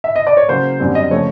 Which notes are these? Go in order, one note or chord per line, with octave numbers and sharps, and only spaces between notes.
E5
D#5
D5
C#5
C#3 F#3 A#3 C5
F#2 D3 G3 C4
D#5
C#3 F3 A3 C#5